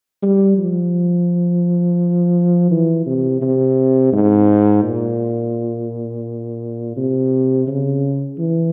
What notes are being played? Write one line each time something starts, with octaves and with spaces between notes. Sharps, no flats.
G3
F3
E3
C3
C3
G#2
A#2
C3
C#3
E3